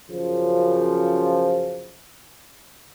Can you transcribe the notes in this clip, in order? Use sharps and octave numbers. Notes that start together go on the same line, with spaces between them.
F#2 C#3 F3